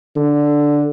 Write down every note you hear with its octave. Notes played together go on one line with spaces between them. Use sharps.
D3